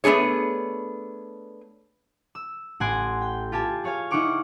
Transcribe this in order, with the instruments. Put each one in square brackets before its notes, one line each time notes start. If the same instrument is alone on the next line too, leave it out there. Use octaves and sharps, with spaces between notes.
[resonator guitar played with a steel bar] A3 B3 D4 G#4 C#5
[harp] E6
A1 F#5 G#5 C6 D7
G5
F4 G4 G#5 A5
G#4 C#5 F5 G#5
D#4 E4 F#5 C#6 D6 F6